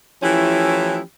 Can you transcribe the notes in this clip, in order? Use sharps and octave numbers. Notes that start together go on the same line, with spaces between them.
E3 F3 A3 C#4 E4 G4